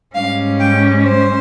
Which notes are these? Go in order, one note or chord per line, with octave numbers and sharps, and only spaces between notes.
G#2 G3 C#4 F5
G5
C5